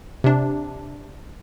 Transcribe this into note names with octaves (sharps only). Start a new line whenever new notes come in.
C3 D4